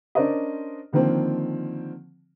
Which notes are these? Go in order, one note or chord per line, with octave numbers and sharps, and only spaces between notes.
C#4 D4 A#4 C5 D5 D#5
D3 D#3 F3 A#3 C4